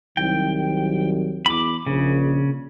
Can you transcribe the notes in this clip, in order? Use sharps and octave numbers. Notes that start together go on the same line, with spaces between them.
C2 D#3 F#3 G5
E2 B5 D6
A#1 C#3